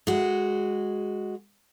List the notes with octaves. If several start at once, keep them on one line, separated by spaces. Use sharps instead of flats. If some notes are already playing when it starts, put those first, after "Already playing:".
G#3 F#4